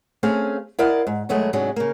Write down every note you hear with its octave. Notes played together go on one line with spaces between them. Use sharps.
A3 C4 C#4 G#4 F5
E4 A#4 D5 D#5 F5 F#5
G#2
D#2 B2 F#3 G#3 A3 G#4
G#2 C3 F#3 G#3 C#4 D4
C#3 A#3